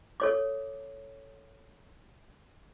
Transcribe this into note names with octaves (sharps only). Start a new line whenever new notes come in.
A4 C#5 D6